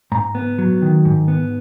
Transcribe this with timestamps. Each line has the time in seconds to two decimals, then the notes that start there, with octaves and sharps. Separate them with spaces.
0.12 G#2 A#5
0.35 B3
0.58 F#3
0.82 D#3
1.05 G#2
1.28 B3